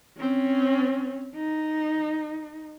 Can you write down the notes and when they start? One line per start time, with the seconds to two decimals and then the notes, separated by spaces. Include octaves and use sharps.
0.18 C4 C#4
1.35 D#4